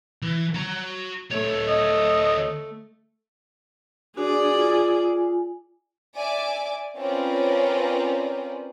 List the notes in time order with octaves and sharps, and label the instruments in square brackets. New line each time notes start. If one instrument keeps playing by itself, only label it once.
[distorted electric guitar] E3
F#4 A#5
[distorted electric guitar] D2 C#5 [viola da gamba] A3
[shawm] D#5
[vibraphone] D4 F#4 G#5 [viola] G#4 D5
[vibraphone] F4 G#5
[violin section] D5 E5 G#5 D6
C4 C#4 F4 A#4 B4 D5